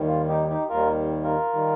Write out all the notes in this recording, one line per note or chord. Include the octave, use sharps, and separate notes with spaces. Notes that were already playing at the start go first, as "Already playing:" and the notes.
Already playing: D#2 D#3 G3
F4
D#4 G4
D#4 G4
D#2 D#3 G3 F4 A#4
F4 A#4
D#3 G3